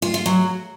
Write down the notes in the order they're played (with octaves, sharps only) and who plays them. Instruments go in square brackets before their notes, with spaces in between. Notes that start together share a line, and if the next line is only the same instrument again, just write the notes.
[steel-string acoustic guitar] F4
F4
F#3